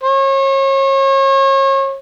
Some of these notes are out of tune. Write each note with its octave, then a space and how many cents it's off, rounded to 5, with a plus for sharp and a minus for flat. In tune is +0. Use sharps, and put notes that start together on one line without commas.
C#5 -35